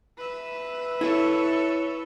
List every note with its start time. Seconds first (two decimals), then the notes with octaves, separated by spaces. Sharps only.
0.18 B4 E5
1.01 E4 A4 C#5